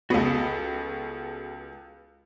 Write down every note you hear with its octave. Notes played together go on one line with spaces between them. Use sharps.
C#2 B3 F#4 G#4 A4